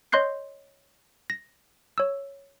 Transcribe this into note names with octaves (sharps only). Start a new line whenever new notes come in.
C#5 D#5 C6 F#6 G6 C7
A#6
C#5 E6